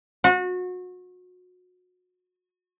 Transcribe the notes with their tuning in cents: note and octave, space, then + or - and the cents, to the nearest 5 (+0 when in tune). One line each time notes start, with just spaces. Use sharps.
F#4 -30